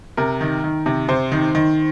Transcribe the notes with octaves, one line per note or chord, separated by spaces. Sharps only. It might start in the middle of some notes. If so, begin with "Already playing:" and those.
C3 A#4
D#3
D#3
C3
C3 C5
D#3
D#3